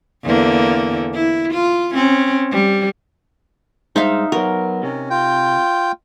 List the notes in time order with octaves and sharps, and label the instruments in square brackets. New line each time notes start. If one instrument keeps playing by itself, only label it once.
[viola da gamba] E2 D3 A#3
E4
F4
C4 C#4
G3
[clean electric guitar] G2 G#3 C5 [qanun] D#4 E5 F5
[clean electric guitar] F#3 B3 F#4 [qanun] A#4
[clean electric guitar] C3 [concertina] C#4
[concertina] F4 G5